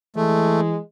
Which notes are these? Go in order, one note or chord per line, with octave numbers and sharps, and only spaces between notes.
E3 G#3 A3